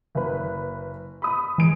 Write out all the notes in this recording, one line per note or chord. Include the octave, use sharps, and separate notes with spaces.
F#1 B4
B5 D#6
E3 G#3 D7